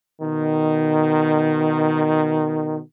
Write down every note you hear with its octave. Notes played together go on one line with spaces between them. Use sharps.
B2 D#3